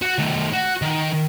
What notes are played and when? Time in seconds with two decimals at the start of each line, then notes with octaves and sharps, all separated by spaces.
0.02 F#4 F#5
0.18 D#3 A3
0.53 F#4
0.82 D#3